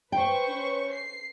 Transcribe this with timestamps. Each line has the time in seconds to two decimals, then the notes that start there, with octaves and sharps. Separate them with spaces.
0.12 B4 C5 G5 C#6
0.47 C#4
0.92 C7